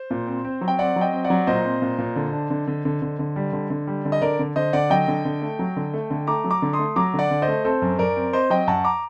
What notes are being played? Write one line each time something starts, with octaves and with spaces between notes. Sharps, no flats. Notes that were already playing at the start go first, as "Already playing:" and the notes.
Already playing: C5
A#2
C4
C4
F#3
G5
C4 D5 F#5
F#3
D#5 G5
C4
D5 F#5
F#3
A#2 C5 D#5
C4
A#2
A#2
D3
D4
D3
D3
D3
D3
D3
G3
D3
D3
G3
D3
D#5
D3 A#4 D5
D3
D3 C5 D#5
D3 D5 F#5
F#3 D#5 G5
D3
D3
A3
F#3
D3
A3
D3
A3 A#5 D6
F#3
A#5 D6
D3
C6 D#6
A3
F#3 A#5 D6
D3
D5 F#5
D3
C5 D#5
A3
C4 A4 C5
F#2
F#2 A#4 D5
C4
C4 C5 D#5
F#3 D#5 G5
F#2 F#5 A5
A#5 D6